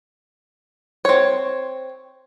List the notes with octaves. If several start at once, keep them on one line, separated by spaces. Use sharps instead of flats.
C4 C#5